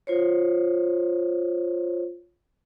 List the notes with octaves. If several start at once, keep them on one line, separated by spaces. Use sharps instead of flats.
F4 C5 C#5